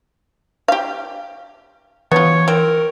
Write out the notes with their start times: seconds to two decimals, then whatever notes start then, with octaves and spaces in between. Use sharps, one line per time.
0.68 G4 F5
2.12 E3 B3 F4 C#5
2.48 C4 A#4